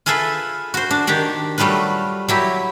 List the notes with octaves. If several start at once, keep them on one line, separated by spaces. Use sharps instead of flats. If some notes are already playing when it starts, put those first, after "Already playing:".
F4 G#4 A4 B4 E5
F#4 C5
D4
D#3 D4 G4 D5
F#3 G3 A3 F4 B4
F#3 E4 G4